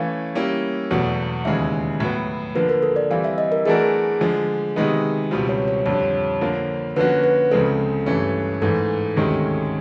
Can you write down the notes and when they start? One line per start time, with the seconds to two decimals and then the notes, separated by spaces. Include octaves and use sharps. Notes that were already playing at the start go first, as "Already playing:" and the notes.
Already playing: E3 A3 C#4 F5
0.35 G3 A#3 C#4 E4 G4
0.91 E2 B2 F#3 A3
1.45 D#2 C#3 E3 G#3 E5
2.00 A2 F#3 B3
2.55 D3 F3 A#3 B4
2.69 A#4
2.82 A4
2.96 D5
3.10 E3 G3 C4 F5
3.24 E5
3.38 D#5
3.52 A#4
3.66 E3 A3 D4 F#4 G#4 A#4
4.21 D3 F3 G#3
4.76 C3 D#3 G#3 B3 D#4
5.31 C#2 B2 G3 C4 F4
5.49 C#5
5.68 C#5
5.86 F2 D3 G3 C#5
6.41 D3 F3 A#3
6.96 D3 F3 A#3 C#4 F#4 B4
7.24 B4
7.51 C#2 C#3 F3 G#3 C4 A4
8.06 G2 E3 A3 C#4
8.62 G#2 E3 A3 A4
9.17 D2 C3 D#3 G#3 C#4